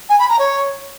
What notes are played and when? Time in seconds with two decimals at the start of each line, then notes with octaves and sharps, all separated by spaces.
0.09 G#5
0.19 B5
0.29 A#5
0.39 C#5